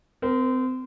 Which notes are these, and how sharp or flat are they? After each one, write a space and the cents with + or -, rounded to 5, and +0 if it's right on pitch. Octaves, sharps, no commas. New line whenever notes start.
C4 -30 A#4 +5